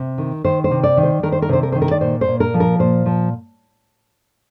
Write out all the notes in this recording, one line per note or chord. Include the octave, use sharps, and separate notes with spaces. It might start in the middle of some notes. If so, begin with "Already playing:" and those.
Already playing: C3
D#3
D#3 C5
C5
C3
D5
D#3
C5
D#3 A#4
C5
A#4
C3 C5
A#4
D#3 C5
A#4
D5
A#2 C5
C5
A#2
A#4
F3
A#4
A#2 C5
F3